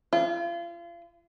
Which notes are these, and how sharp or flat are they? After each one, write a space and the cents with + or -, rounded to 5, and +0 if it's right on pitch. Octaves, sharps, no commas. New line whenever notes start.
F4 -35